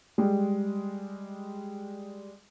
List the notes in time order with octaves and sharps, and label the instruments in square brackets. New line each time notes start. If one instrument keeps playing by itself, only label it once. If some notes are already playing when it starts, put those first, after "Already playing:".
[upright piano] G3 G#3